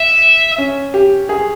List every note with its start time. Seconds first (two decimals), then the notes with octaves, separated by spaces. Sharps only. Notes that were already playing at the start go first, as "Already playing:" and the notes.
Already playing: E5
0.58 C#4
0.94 G4
1.29 G#4